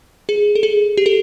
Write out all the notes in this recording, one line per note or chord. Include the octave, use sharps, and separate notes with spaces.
G#4
A4
G#4
G4
A4